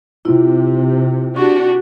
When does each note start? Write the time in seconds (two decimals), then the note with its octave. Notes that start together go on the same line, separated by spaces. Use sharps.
0.25 C3 C4 E4 F4
1.36 D4 F#4 G4 C#6